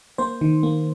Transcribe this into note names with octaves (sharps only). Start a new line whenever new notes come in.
A#3 C5
D#3
A#3